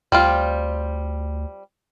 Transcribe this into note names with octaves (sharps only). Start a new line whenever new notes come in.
D2 G3 C4 F4